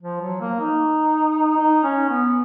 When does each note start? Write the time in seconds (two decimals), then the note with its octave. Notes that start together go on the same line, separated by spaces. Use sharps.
0.02 F3
0.21 F#3
0.41 A#3
0.60 D#4
1.57 D#4
1.84 C#4
2.09 B3